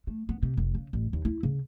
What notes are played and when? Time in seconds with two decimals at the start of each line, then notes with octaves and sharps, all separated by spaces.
0.07 A3
0.29 B3
0.43 C3
0.57 F1
0.75 C#3
0.93 A1
1.13 D#2
1.25 E4
1.43 C#3